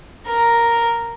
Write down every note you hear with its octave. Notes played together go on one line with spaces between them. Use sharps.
A#4